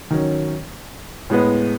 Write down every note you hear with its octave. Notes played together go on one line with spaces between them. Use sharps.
D#3 F#3 C#4
A2 G#3 B3